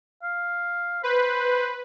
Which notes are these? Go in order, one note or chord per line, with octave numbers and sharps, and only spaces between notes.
F5
B4 C5